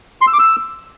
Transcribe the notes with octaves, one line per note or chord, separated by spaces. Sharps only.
C6
E6
D6
E6